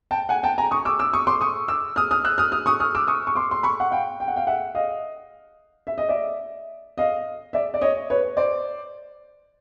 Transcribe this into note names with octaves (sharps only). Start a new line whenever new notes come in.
G5 A5
F#5 G#5
G5 A5
G#5 A#5
C#6 D#6
D6 E6
D6 E6
C#6 D#6
C6 D6
C#6 D#6
D6 E6
D#6 F6
D#6 F6
E6 F#6
D#6 F6
D#6 F6
C#6 D#6
D#6 F6
D6 E6
C#6 D#6
C#6
C6 D6
C6
B5 C#6
F#5
F5 G5
G5
F#5
F5 G5
E5 F#5
D#5 F5
E5
D#5
D5 E5
D#5 F5
D5 E5
D5
C#5 D#5
B4 C#5
C5 D5